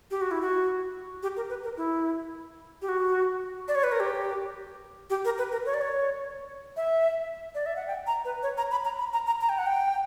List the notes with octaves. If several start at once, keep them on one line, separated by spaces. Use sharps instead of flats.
G4
F#4
E4
F#4
G4
A#4
B4
A#4
E4
G4
F#4
D5
C#5
B4
A#4
G4
G4
A#4
B4
A#4
C#5
D5
C#5
E5
D5
E5
F#5
G5
A#5
B4
C#5
A#5
B5
A#5
B5
A#5
A#5
A#5
G5
F#5
G5